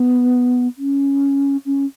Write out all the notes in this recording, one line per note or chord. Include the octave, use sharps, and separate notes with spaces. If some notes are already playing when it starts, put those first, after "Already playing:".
Already playing: B3
C#4
C#4